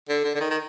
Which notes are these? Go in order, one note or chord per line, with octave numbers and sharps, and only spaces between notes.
D3
D3
D3
D#3
D#3